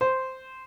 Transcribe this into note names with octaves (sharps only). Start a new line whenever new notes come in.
C5